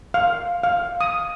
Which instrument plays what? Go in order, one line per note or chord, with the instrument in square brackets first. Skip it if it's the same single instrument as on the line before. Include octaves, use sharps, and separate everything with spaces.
[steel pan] F5
F5
D#6